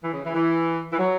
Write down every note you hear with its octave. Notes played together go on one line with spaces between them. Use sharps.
E3
C#3
E3
E3
E3
F#3